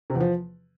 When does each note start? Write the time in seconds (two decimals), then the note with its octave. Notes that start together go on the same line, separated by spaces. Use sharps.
0.10 C3
0.15 E2
0.20 F3